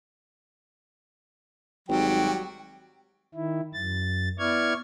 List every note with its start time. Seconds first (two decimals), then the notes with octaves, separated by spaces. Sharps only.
1.89 G#1 F#3 G3 G5
3.34 D#3 E4
3.74 F#2 A6
4.39 B3 E4 D5 C#6 F6 G#6